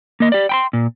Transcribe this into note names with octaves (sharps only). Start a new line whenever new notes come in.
A#3 D#5
G4 D5
G5 B5 C6
A#2